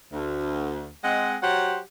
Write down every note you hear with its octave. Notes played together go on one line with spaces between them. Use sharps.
D2
G#3 C4 D#5 F#5
F#3 G4 C5 F#5